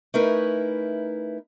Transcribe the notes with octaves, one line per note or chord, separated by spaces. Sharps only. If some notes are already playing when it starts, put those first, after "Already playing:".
A3 C#4 D#4 E4 A#4 B4